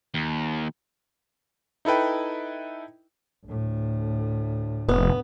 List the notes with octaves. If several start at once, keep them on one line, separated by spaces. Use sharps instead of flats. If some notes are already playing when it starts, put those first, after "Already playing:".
D#2
D#4 E4 A4 B4 G5
D2 A2
F1 B3